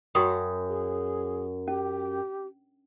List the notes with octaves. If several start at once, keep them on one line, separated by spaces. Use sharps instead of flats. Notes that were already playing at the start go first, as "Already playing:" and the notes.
F#2 F#4 G5 D#6
G#4
C#4 G4